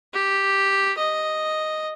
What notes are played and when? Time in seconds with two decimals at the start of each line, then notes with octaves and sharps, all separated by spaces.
0.14 G4
0.98 D#5